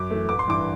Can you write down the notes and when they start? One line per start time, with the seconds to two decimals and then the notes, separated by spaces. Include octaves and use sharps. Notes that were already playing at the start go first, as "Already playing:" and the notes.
Already playing: F#2 D6
0.10 E3 A3
0.29 A1 D6
0.39 C6
0.48 G2 E3 D6